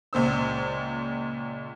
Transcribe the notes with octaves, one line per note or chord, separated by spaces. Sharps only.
C#2 A#2 C5 E6